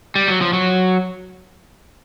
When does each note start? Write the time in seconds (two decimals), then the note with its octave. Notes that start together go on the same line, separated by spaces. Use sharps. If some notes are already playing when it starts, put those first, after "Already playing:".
0.15 G3
0.28 F#3
0.41 F3
0.53 F#3